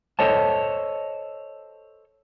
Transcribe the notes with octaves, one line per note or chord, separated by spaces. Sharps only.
A4 C5 C#5 D#5 A5